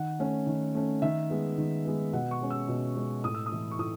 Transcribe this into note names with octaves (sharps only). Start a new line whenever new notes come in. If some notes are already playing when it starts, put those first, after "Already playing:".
Already playing: D#3 F#5
A3 C#4
D#3
A3 C#4
D#3 E5
G#3 B3
D#3
G#3 B3
B2 F#5
C#6
G#3 C#4
E6
B2
G#3 C#4
A2 D#6
E6
D#6
E3 A3
C#6
A2 D#6